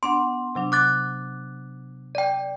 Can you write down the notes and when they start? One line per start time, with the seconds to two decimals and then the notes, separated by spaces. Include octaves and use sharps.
0.03 B3 D4 F#5 C6
0.55 C3 F#3 D4
0.72 D6 F#6 A6
2.15 D5 G5